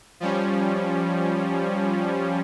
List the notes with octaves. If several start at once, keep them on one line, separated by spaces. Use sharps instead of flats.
F3 G3 C#4